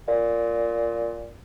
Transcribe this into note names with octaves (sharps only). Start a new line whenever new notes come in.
A#2